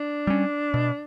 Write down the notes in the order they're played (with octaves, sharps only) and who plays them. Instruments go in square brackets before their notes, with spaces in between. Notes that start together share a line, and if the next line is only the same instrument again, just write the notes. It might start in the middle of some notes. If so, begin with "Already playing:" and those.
Already playing: [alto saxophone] D4
[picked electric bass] G3 C#4
B2